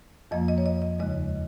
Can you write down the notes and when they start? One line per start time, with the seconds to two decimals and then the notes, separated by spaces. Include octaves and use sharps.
0.31 F2 F3 A#3 D#5
0.48 D#5
0.58 C#5
0.66 D#5
0.82 D#5
1.00 D#2 C#3 G#3 D#5